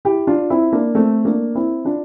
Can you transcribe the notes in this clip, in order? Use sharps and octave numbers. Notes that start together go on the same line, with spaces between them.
E4 G4
D4 F4
C4 E4
A#3 D4
A3 C4
A#3 D4
C4 E4
D4 F4